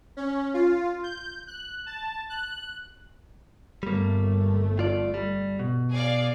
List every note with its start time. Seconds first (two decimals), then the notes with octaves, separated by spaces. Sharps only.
0.17 C#4
0.54 F4
1.03 G6
1.47 F#6
1.86 A5
2.30 F#6
3.83 G1 G3 A3 A#3
4.79 F4 D5
5.14 G3
5.59 B2
5.92 G#4 D5 F5